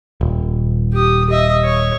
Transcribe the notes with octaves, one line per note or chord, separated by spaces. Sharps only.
D#1
G4 D#6
D#5 E5
C#5